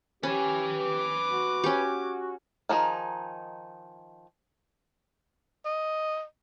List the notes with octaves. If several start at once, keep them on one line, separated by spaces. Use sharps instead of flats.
C#4 G4 B4 G#5
D6
F#4
C#4 G4
D#3 F3 D#4 G#4
D#5